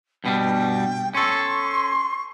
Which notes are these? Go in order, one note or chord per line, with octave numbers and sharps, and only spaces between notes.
G2 B2 G3 G5
C#4 A4 C6 C#6